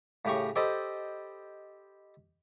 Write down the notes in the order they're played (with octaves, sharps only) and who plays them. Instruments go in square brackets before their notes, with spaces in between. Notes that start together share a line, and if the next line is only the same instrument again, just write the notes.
[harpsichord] A2 C#3 G4 A#5 C#6
G4 A4 C5 D#5 B5 D6